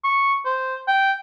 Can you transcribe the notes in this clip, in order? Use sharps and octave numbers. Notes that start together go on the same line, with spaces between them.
C#6
C5
G5